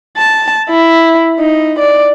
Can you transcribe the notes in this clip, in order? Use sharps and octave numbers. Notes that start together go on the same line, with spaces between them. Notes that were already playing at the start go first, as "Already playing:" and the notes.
A5
E4
D#4
D5